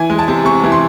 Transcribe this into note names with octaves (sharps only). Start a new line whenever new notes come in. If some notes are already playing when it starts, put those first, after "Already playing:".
Already playing: E3 G#5
G#3
A5
C3
C3 C#6
E3
C6